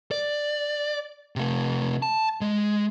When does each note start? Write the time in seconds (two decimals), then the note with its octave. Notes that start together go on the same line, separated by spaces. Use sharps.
0.11 D5
1.36 C3 A3
2.02 A5
2.41 G#3